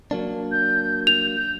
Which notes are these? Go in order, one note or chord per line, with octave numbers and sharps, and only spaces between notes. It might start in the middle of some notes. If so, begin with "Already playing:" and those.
F#3 A#3 D4
G6
G6 F7
G6